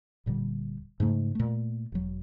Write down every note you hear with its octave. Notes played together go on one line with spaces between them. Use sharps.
D#1 A#2 D3 G3
G#2 C#3 A3
A#2 A3
E1 F#3